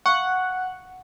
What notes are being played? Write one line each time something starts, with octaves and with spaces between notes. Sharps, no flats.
F5 F#5 C#6